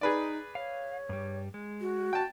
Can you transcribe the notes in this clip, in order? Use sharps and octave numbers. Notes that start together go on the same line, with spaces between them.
D#4 G#4 B4 D5
C#5 F5
G2 G3
G#3
F#4
G5 A5